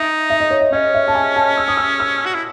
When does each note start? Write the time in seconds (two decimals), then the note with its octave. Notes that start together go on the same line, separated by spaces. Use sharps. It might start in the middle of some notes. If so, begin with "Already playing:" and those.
Already playing: D#4 E5
0.30 E5
0.40 D#5
0.50 C#5
0.61 D#5
0.73 C#4 D#5
0.94 E5
1.08 A5
1.15 G#5
1.36 A5
1.57 E6
1.68 D#6
1.77 E6
2.00 E6
2.26 F#4
2.34 E4